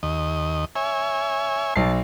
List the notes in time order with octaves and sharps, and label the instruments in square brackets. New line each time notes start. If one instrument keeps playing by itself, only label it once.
[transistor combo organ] D#2 D#5
C#5 E5 G#5
[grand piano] B1 C7 [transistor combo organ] A5